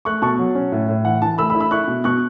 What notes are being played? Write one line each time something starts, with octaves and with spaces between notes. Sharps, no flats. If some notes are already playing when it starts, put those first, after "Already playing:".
A3 C#6 F#6
B2 A5 C#6
F#3
C#4
A2
A2
E3 F#5
E3 A5
A3 B5 E6
B5 E6
E4
B5 E6
E4 C#6 F#6
B2
B2 C#6 F#6